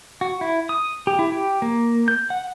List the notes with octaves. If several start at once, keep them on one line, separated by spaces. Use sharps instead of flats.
F#4
E4
D#6
G4
E4
G4
A#3
G6
F#5